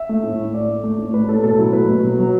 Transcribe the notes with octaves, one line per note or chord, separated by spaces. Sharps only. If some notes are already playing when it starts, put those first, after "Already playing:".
Already playing: E5
A3
A2
A2
A3 D5
A3
A3
A2
A2 B4
A2 A4
B2 A4
F#3 E4
A3 B4
B2
F#3
F#3